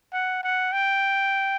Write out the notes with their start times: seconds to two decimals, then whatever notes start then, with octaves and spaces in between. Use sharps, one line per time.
0.13 F#5
0.43 F#5
0.73 G5